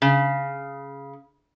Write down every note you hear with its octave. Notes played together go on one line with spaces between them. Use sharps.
C#3